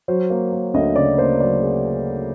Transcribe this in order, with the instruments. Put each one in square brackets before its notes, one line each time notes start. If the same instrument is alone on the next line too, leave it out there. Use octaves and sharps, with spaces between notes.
[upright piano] F#3 C5
A#3
A#3
D2 D#5
C#3 D5
A#3 C5
F#3 D5
G#4